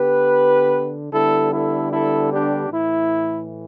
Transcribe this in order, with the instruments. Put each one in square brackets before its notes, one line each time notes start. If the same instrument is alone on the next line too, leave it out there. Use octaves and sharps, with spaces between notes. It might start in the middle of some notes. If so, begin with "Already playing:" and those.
Already playing: [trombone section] D3 B3 G4 B4
D3 G3 B3 E4 A4
E4 A4
E4 A4
D4 G4
A2 E3 A3 E4